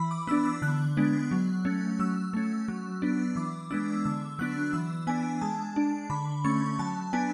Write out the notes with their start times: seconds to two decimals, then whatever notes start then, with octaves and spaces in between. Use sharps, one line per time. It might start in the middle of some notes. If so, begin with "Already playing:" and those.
Already playing: E3 B5
0.11 D6
0.27 B3 D4 E6
0.45 E6
0.62 D3 F#6
0.97 G#3 B3 D4
1.31 F#3
1.65 A3 C#4
1.99 F#3 E6
2.33 A3 C#4
2.68 F#3
3.02 B3 D4
3.36 E3 D6
3.71 G#3 B3 D4 E6
4.05 D3 E6
4.39 F#3 B3 D4 F#6
4.73 E3 E6
5.07 B3 D4 G#5
5.41 G#3 A5
5.76 D4
6.10 D3 B5
6.44 A3 C#4 C#6
6.79 F#3 A5
7.13 B3 D4 G#5